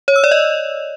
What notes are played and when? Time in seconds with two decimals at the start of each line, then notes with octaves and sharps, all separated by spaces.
0.08 C#5
0.16 E6
0.24 D5
0.31 D#5